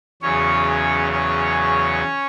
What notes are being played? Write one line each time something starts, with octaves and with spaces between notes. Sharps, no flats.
E2 C#3 F#3 C#4 C#5
C#4 C#5